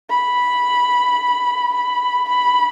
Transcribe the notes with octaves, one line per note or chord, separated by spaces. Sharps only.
B5
B5
B5